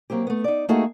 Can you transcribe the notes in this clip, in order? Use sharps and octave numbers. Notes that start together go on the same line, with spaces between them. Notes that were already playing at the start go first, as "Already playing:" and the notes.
F#3 A#3 C4 G4
A3 B3
D#4 D5
A3 A#3 D#4 F#4 G#4 A4